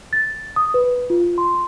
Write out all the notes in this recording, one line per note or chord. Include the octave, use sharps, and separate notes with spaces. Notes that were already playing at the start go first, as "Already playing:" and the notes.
A6
D#6
B4
F4
C6